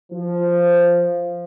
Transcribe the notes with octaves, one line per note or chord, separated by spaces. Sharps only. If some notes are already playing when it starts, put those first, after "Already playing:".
F3